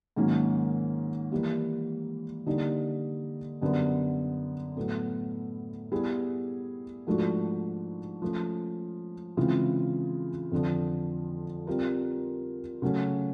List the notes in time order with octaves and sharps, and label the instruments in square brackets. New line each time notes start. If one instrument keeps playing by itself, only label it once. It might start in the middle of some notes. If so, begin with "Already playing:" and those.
[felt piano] G#2 D#3 F#3 A#3 C#4
E3 G3 A#3
D3 G3 A#3 D#4 G4
F#2 D3 G3 B3
A2 F#3 B3
G3 B3 E4 G#4
G#2 F3 A3 D4 F#4
F3 A3 C#4
C#3 E3 G#3 C4 F4
F2 D3 F3
G3 C4 F4 A#4
C#3 F#3 A3 C#4